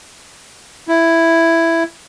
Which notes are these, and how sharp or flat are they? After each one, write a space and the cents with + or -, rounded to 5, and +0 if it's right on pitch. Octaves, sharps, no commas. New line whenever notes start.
E4 +5